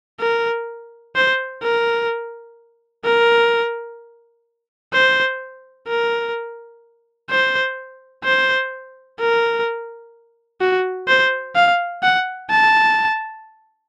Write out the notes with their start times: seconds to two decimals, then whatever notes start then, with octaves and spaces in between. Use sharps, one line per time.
0.20 A#4
1.15 C5
1.63 A#4
3.04 A#4
4.93 C5
5.88 A#4
7.30 C5
8.24 C5
9.20 A#4
10.61 F#4
11.08 C5
11.56 F5
12.03 F#5
12.50 A5